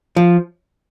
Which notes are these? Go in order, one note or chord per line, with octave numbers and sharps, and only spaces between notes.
F3